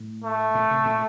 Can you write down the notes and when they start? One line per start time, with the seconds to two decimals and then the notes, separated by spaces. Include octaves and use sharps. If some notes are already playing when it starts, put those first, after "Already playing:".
Already playing: A2
0.24 A3
0.55 A#2
0.71 C3
0.85 A#2